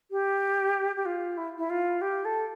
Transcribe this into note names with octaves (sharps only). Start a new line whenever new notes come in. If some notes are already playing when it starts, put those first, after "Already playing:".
G4
G4
F4
E4
E4
F4
G4
A4